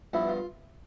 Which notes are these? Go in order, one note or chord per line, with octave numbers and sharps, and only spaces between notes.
G2 F3 B3 E4
F4